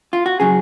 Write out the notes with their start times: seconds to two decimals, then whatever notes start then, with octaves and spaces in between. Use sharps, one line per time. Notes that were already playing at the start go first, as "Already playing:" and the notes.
0.13 F4
0.26 F#4
0.40 C#3 F#3 G#4